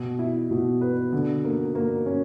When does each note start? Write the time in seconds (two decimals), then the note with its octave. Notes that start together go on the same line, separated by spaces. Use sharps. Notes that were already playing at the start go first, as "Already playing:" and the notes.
Already playing: B2
0.19 E4
0.51 B2
0.81 B4
1.13 D3
1.44 A#3
1.75 A#3
2.06 C#4